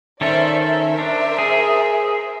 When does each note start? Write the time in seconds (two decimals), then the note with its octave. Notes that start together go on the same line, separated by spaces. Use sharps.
0.21 D#3 C#4 A4 C5 D5 E5
0.64 A#4 C5 E5
0.99 D4
1.39 G#4